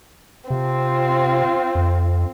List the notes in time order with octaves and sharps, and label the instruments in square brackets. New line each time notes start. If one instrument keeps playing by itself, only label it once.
[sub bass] C3 [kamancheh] C4 F4
[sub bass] F2